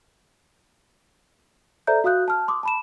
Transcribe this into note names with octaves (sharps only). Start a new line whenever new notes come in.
A4 C5 D5 E5 A#5 G6
F#4 F5 D#6 F#6 G6
A5 F6
C6 D6 D#6
A5 B5 E7